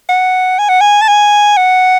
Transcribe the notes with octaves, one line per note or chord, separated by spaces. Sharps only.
F#5
G#5
F#5
G#5
A5
G#5
F#5